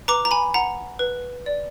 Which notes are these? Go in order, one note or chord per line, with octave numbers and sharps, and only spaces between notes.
B4 A#5 D6
A#5
G#5 B5
F#5 A#5
B4
D5